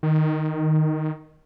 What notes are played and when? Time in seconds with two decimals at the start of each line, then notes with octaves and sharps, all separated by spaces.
0.03 D#3